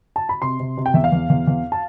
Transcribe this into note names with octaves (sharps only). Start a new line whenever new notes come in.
A5
B5
C3 C6
C3
C3
G5
E2 E5
F5
E2
E2
E2
A5